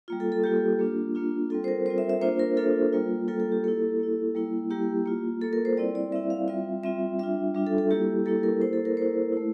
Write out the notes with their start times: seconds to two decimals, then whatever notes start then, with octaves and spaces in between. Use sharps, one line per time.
0.08 G3 A#3 F4
0.20 A4
0.32 A4
0.44 G3 A#3 F4 G4
0.79 A#3 D4 F4
1.15 A#3 D4 F4
1.50 G3 C4 F4 A4
1.64 C5
1.68 A#4
1.86 G3 C4 F4 C5
1.98 E5
2.09 E5
2.21 A#3 D4 F4 C5
2.39 A#4
2.57 A#3 D4 F4 A4
2.93 G3 A#3 F4
3.28 G3 A#3 F4 A4
3.40 A4
3.52 G4
3.64 A#3 E4 A4
3.99 A#3 E4
4.35 G3 A#3 E4
4.70 G3 A#3 E4 G4
5.06 A#3 F4
5.41 A#3 F4 A4
5.53 A#4
5.65 C5
5.77 G3 C4 E4 D5
5.95 D5
6.12 G3 C4 E4 E5
6.30 F5
6.48 G3 C4 F4 E5
6.83 G3 C4 F4 E5
7.19 G3 D4 F4 E5
7.55 G3 D4 F4
7.67 A4
7.78 A4
7.90 G3 A#3 E4 G4
8.25 G3 A#3 E4 A4
8.43 A#4
8.62 A#3 E4 C5
8.73 A4
8.85 A#4
8.97 A#3 E4 C5
9.33 A3 E4